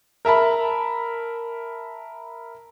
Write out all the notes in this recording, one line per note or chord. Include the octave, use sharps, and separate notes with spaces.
A#4 E5 A5 B5